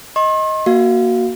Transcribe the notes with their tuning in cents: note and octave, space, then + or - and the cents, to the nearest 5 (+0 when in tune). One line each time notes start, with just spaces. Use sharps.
D#5 +15 C6 +45
A#3 +5 F#4 +0 F5 -5